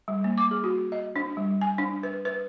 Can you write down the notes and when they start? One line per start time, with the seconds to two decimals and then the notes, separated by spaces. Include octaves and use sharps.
0.08 G3
0.24 A#3
0.38 D6
0.51 G#4
0.64 F#4
0.92 D#5
1.16 D4
1.37 G3
1.61 G#5
1.78 D4
2.03 B4
2.25 B4